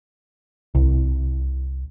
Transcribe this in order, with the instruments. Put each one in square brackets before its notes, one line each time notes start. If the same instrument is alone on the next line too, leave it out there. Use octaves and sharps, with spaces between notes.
[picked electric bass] C2